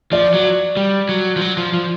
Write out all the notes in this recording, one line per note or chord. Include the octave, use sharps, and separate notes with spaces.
F3 D5
F#3
G3
F#3
F3
F#3
F3
F3